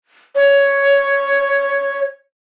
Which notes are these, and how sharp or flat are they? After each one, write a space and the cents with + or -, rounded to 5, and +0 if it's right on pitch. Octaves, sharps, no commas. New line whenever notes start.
C#5 +5